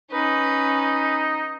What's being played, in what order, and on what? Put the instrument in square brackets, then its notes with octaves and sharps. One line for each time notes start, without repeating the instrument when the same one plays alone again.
[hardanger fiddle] C#4 B4 [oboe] D#4